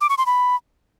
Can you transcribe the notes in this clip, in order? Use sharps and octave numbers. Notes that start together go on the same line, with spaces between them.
D6
C#6
C6
B5